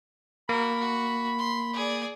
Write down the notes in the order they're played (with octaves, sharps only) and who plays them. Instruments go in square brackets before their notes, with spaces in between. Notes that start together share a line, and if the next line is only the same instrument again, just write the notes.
[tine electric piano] A#3 [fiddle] F#4 A#4 [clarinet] B5
[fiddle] F#4
C6
G#4 D5